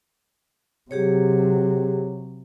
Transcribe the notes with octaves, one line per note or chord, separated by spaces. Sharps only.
C3 F#3 G4 G#4 C#5